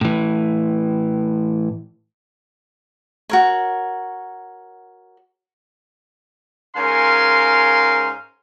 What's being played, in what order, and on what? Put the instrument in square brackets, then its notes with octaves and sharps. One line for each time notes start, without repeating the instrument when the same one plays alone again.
[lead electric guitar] A2 E3
[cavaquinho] F#4 A#4 C#5
[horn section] G#2 C#4 A#4 F5 G#5 C6